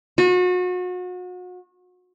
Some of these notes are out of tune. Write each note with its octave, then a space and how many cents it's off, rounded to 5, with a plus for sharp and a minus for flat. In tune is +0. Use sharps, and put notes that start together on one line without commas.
F#4 -35